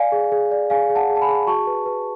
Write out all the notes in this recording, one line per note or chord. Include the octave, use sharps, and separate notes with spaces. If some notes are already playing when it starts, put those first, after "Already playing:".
Already playing: D5 F5 G#5
G#4
G#4
D5
G#4 F5 G#5
G#4
F#5 A5
G#4
A5
G#5 B5
G#4
F#4 A5 C#6
B4
B4